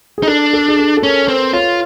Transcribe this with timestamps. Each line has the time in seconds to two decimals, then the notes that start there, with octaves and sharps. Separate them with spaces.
0.18 G#4
0.23 D#4
0.27 D4 A4
0.53 A4
0.68 G#4
0.79 A4
0.97 A4
1.03 C#4 A#4
1.23 A#4
1.28 C4 B4
1.53 F4 C#5